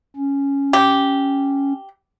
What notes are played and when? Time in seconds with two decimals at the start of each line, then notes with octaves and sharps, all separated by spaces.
0.16 C#4
0.73 G4